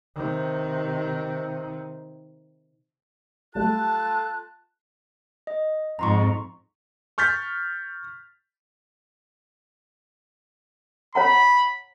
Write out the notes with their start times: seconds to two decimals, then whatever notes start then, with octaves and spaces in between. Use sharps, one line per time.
0.16 C3 D#3
3.55 F#3 G3 A3 F4 A4 A5 F#6
5.47 D#5
5.99 F2 G#2 A#5 C6 C#6
7.18 C#6 F6 G6 A6 B6
11.15 C#5 F#5 A#5 B5